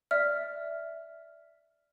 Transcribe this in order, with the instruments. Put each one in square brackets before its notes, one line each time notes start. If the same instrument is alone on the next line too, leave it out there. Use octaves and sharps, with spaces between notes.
[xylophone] D5 E5 F6